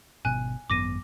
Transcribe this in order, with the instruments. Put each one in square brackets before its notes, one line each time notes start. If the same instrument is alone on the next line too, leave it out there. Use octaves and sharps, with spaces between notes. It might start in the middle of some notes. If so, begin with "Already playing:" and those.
[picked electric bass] G#1 B2 [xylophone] G#5 F#6
[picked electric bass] G#1 F#2 B3 [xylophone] D6 A#6 D#7